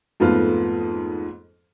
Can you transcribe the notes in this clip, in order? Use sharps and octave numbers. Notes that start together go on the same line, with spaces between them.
F2 G#2 A3 B3 F4